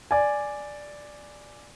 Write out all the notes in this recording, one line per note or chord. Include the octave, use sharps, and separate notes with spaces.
D5 G#5